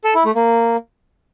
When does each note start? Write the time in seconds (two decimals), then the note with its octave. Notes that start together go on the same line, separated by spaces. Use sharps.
0.04 A4
0.15 E4
0.25 A3
0.35 A#3